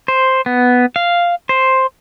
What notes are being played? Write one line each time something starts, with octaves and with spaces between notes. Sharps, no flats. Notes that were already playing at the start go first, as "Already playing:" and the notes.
C5
B3
F5
C5